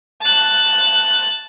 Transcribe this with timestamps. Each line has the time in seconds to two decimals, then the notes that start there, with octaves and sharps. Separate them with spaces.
0.21 A5 F#6